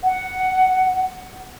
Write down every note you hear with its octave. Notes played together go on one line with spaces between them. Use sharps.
F#5